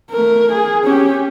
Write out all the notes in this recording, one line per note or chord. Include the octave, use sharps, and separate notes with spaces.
A3 A#4
G#4
C#4 G4